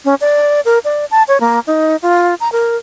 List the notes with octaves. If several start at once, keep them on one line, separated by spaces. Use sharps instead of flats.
C#4
D5
A#4
D5
A5
C#5
A#3
D#4
F4
A#5
A#4